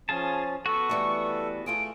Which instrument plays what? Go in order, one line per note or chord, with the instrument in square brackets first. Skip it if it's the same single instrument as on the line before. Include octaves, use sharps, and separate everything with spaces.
[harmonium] F3 C#4 [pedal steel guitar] F4 G#4 A5 [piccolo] A6
[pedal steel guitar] B3 F#4 [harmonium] A4 [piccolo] C#6
[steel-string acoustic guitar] E3 G3 A3
[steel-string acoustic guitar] A3 F4 G#4 [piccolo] D7